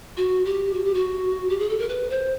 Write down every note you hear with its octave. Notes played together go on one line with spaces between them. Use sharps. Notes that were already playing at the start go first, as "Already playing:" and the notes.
F#4
G4
F#4
G4
F#4
G4
G#4
A4
A#4
B4
C5